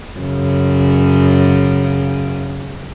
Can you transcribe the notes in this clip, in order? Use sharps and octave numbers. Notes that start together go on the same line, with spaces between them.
F#2 C#3